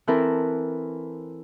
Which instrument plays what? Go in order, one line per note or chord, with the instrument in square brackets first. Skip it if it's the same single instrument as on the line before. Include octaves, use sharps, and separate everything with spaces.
[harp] E3 C4 E4 A4 A#4